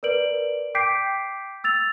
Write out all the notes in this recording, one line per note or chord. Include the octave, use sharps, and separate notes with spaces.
A#4 B4 D5 D7 F#7
G5 D6 G6 B6 C7 D7
E6 A6 F7